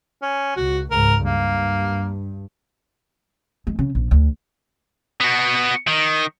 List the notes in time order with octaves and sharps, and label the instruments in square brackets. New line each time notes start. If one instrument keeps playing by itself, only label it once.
[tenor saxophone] C#4
[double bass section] C#2 [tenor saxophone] F#4
[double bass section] C#2 G#2 [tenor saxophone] A#4
[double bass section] G2 [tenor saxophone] A#3
[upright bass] G#3
C#3
A#1
D2
[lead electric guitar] B3 F#4
D#3